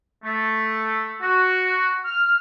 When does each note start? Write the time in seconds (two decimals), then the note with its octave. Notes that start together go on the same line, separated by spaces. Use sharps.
0.24 A3
1.21 F#4
2.05 F6